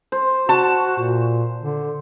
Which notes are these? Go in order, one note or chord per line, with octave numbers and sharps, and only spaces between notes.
C5
F#4 A5
A#2
D3